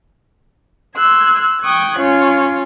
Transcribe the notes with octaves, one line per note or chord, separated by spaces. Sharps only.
C6 E6 F#6 G#6
G5 C#6 D#6 F#6 G#6
C#4 F4 C#5